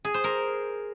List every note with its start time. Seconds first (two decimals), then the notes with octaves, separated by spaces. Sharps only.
0.05 G#4
0.14 C5
0.24 A#4